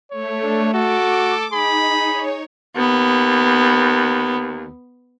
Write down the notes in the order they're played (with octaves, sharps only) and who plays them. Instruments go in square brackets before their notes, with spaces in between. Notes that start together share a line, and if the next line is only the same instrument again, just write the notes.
[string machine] A3 [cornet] C#5
[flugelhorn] D4
[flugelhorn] F#4 [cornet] A4 [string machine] D6
[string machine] D#4 [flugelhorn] G#4 [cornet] B5
[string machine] C#5
[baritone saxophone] D#2 [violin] B3